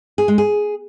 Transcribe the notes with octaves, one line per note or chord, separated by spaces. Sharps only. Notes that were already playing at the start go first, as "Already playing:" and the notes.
G#4
G#3
G#4